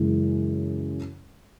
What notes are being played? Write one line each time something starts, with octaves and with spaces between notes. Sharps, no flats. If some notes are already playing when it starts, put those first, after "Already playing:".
Already playing: F#2 C#3 E3 G#3